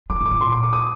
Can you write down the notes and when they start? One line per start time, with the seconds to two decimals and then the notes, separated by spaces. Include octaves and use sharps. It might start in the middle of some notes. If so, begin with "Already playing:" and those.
0.10 G#3 D6
0.21 A#2
0.26 D6
0.31 A#2
0.41 C6
0.52 D6
0.63 D6
0.73 D#6